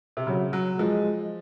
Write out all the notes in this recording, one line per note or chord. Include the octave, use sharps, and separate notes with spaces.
C3
C#3 F#3
F#3
F3 G#3